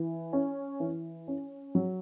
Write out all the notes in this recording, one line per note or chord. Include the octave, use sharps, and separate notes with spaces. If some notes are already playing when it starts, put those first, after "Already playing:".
Already playing: E3
C#4
E3
C#4
F#3